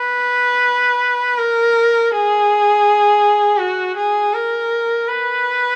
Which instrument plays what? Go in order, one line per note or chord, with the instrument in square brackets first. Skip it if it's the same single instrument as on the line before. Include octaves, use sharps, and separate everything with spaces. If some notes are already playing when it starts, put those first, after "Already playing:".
Already playing: [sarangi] B4
A#4
G#4
F#4
G#4
A#4
B4